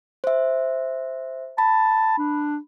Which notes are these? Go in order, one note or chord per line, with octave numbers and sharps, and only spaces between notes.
C5 E5
A5 B5
D4